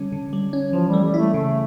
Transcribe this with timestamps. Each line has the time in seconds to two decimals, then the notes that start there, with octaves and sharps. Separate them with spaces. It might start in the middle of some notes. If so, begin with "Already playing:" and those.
Already playing: D3 G3 C#4
0.12 D3
0.33 G3
0.53 C#4
0.73 E3 F3
0.88 G3
0.93 A3
1.03 G3
1.14 E4
1.19 A3
1.34 C#3 A3